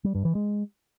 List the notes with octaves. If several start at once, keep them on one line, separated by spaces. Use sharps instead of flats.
G3
G2
E3
G#3